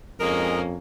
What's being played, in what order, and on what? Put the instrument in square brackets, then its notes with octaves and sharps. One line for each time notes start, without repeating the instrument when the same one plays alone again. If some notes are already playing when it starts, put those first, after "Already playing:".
[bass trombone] F2 [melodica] G#3 D#4 G#4 [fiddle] A#3 C#4 [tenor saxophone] A#4